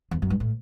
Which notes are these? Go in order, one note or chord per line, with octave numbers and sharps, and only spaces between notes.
E2
F#2
G2
A2